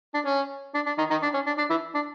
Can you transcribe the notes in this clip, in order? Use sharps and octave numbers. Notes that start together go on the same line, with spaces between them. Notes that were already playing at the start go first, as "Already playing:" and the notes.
D4
C#4
D4
D4
D#3 D#4
D#3 D#4
D4
C#4
D4
D4
E3 E4
D4